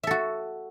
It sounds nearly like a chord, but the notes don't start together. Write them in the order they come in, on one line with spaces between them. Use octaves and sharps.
E5 A4 F#4